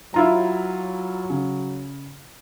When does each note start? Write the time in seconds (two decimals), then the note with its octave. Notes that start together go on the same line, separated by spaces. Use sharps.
0.14 F#3 E4 F4 A#5
1.30 C#3